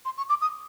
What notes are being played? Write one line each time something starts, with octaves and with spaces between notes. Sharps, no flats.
C6
C#6
D6
D#6